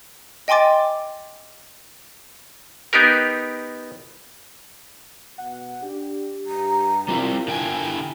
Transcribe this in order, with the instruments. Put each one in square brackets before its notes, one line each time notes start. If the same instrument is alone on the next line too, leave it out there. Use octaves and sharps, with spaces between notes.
[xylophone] D#5 G5 G#5 C6 D6 A6
[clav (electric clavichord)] B3 D#4 G4 A#4
[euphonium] B2 [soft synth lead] F#5
[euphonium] D4 [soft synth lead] G4
[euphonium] G2 [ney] A#5
[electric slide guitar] G3 C4 E4 [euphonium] F4 [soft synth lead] A#4
[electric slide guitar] D3 G5 G#5 [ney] E4